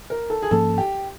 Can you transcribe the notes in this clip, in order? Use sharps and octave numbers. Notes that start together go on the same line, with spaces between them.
A#4
A4
G#4
G#2 F3 A#3 C#4 A4
G4